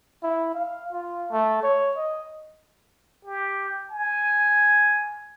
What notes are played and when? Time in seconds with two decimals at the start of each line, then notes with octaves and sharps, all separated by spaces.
0.23 E4
0.55 F5
0.93 F4
1.31 A3
1.63 C#5
1.97 D#5
3.25 G4
3.91 G#5